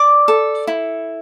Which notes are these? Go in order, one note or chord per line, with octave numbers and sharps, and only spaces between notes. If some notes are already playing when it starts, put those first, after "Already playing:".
Already playing: D5 D6
A4
E4